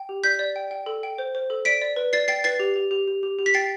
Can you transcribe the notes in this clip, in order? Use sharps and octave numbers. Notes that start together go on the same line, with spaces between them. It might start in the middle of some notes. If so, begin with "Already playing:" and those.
Already playing: G5
G4
D5 G6 B6
D5
G5
G5
A4
G5
C5
C5
A4
D5 B6 D7
D5
B4
D5 A6 C7
G5 A6 C7
B4 A6 C7
G4
G4
G4
G4
G4
G4
B6
G5 A6 C7